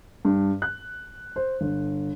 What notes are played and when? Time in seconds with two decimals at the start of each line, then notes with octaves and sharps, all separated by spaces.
0.25 G2
0.62 F#6
1.36 C5
1.61 G1